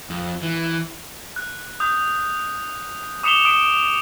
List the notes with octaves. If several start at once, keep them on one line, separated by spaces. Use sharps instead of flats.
F2
E3
F#6
D#6 G6
D6 D#6 C#7 E7 F7 G7
D#6 D7 G7